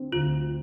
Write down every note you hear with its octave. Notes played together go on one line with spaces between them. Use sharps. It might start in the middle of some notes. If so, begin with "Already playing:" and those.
Already playing: D3 C4
D2 F4